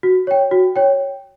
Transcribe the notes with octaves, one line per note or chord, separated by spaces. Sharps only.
F#4
C#5 G5
F#4
C#5 G5